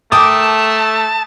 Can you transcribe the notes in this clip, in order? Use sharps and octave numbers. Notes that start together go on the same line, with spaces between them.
A3 A#4 G5 A5 D6 D#6